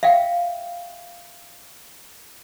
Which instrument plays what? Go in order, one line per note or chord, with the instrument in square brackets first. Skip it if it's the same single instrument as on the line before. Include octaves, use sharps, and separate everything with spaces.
[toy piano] E5 F5 G5